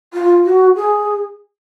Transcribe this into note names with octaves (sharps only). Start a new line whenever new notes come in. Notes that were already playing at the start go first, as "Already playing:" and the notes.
F4
F#4
G#4